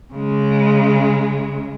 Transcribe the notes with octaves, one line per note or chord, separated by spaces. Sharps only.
C#3 G#3